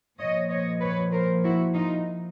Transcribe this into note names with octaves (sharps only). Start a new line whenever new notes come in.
A#2 F3 C#5 D#5
C#5 D#5
B4 C#5
A#4 C5
E4 F#4
D#4 F4